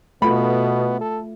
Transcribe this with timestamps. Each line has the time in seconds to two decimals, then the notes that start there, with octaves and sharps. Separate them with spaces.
0.22 B2 A3 B3 F4 A4 B5
1.01 A4